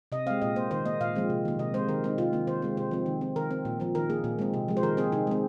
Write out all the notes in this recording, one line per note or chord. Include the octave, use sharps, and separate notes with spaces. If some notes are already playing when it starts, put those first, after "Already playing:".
C3 D#5
G#3 C4 F5
A#2 D#5
A#3 C5
D#3 C5
A#3 D#5
A#2 F5
F3 G#3 C4
C3
D#3 A#3
C3 D#5
G#3 C4 C5
D#3 A#4
G#3 C4 D#4
C3 F4
D#3 A#3
D#3 C5
G#3 C4
C3 C5
F3 C4
D#3
C4
D#3 A#4
C4
A#2
F3 C4
D#3 A#4
A#3 G#4
A#2
G#3 C4
C3
F3 G#3
C5
D#3 A#4
C4 G#4
C3 D#4
G#3 C4